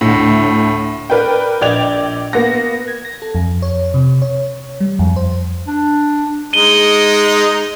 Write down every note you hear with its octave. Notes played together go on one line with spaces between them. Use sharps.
D2 A2
A#4 B4 D5 G5
A#1 D5 D#5 G5 G#6 F7
A#3 B3 A#6
G#6
A#6
A4
F2
C#5
C3
C#5
G3
F2
C5
D4
G#3 D#4 D#7 G7